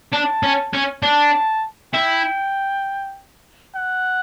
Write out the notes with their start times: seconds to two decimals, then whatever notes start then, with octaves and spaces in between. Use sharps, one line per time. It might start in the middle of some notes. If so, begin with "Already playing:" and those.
0.13 D4 A5
0.43 C#4
0.73 C#4
1.03 D4 A5
1.94 E4 G5
3.75 F#5